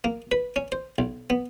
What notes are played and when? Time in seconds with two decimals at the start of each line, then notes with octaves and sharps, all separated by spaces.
0.04 A#3
0.32 B4
0.56 C#4
0.72 C5
0.98 B1
1.30 B3